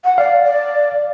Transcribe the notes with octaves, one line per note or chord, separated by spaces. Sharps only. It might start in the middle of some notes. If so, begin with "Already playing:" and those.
F#5
D5 F5
D5